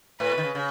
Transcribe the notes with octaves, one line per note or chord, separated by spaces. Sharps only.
A2 B4
B2
D#3
C#3
C#3